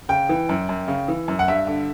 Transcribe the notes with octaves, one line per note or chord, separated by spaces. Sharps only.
C#3 G5
E3
F#2
F#2
C#3
E3
F#2
F#5
G2 E5
D3